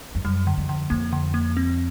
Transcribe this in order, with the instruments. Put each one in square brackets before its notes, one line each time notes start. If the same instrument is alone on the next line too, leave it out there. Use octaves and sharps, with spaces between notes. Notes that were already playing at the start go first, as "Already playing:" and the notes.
[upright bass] F2
[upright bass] F#2 [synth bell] G3
[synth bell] D3
[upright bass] F2
[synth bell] D3
[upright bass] F2 [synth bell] A#3
[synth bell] D3
A#3
C4